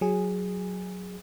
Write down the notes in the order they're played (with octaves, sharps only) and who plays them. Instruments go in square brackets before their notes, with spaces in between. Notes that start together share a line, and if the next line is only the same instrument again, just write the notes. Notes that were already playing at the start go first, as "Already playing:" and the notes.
[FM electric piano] F#3 G#4